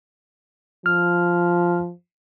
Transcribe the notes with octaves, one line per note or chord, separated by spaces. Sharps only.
F3 F6